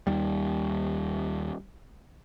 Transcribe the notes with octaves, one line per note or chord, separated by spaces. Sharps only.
D#2 G3